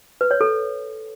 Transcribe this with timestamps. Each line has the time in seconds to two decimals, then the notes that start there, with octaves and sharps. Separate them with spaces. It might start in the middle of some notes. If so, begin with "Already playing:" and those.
0.21 B4
0.31 C#5
0.41 A4